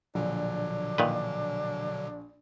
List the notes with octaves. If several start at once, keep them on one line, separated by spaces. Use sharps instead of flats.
A#1 B2 D3 F#3 D4
A#2 D#3 B4